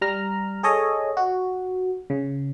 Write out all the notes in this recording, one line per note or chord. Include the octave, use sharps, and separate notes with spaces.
G3 A#5 F6
G#4 A4 C#5 D#5
F#4
C#3